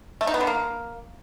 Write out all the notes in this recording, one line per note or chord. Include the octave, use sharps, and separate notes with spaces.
A3
D#4
B3
D3
A#3